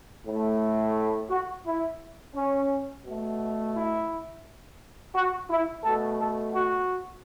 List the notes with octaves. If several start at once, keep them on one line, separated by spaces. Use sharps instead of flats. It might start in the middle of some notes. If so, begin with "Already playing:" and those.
A2 A3
F#4
E4
C#4
B2 A3
E4
F#4
E4
B2 A3 A4
A4
F#4